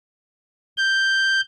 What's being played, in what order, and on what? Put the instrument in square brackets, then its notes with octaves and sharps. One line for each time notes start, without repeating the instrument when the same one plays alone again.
[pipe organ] G6